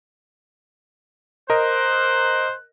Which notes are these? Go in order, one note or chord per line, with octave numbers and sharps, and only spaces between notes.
A#4 C5 D#5 F#6